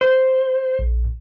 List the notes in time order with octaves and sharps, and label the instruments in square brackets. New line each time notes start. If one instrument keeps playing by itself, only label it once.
[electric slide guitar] C5
[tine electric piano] A#1